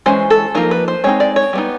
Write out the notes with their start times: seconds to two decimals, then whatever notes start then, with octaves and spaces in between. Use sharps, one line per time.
0.06 E3 G#3 C#4 C5
0.30 A4
0.55 F3 A#3 D#4 A#4
0.71 B4
0.88 C5
1.04 G#3 C4 D#4 C#5
1.20 D5
1.36 C#5
1.53 G3 B3 D#4